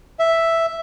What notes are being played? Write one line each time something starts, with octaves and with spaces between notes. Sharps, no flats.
E5